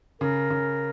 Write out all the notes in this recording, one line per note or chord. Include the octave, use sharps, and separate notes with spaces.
C#3 A#4
C#3